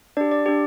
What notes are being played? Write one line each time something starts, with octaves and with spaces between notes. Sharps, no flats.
D4 G4 D5
D5
D4 G4